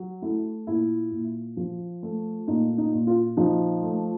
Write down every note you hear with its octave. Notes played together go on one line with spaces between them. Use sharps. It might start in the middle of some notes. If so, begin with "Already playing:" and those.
Already playing: F#3
A3 E4
A#2 E4
A#2
F3
A3
A#2 D#4
D#4
A#2
F4
F3 D#4
A3